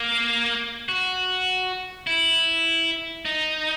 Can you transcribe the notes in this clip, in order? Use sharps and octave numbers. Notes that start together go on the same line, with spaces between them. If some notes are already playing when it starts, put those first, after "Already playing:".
Already playing: A#3
F#4
E4
D#4